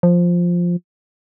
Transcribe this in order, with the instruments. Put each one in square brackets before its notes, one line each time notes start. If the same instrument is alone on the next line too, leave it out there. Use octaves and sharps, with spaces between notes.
[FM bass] F3